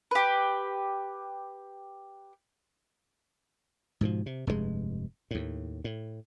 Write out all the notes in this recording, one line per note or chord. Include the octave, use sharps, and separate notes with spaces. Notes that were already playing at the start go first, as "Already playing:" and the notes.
G4 B4
G#2 B2 D#3 F3
C3
F1 G2 C3 G#3
D#2 A2
A2